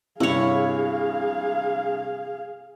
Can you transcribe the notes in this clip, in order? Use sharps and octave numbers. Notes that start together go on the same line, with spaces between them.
G2 C3 C#4 E4 G#4 C#5 F5